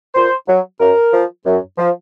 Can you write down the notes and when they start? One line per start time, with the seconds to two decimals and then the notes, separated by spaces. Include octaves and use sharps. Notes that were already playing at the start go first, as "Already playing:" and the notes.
0.15 A#2 C5
0.47 F#3
0.80 F#2 A#4
1.12 F3
1.45 F#2
1.78 F3